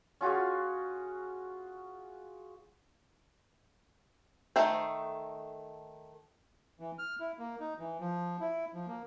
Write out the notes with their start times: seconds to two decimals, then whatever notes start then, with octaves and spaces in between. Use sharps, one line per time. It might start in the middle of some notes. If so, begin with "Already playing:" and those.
0.21 C#4 F4 F#4 G#4
4.56 D#3 A3 D#4 C5
6.80 E3
6.99 F6
7.20 E4
7.39 A#3
7.60 D#4
7.79 E3
8.00 F3
8.41 E4
8.74 F3
8.87 A#3